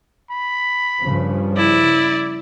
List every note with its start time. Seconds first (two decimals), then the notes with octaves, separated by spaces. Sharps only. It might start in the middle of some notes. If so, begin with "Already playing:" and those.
0.30 B5
1.00 G2 C#3 F3
1.57 E4 D5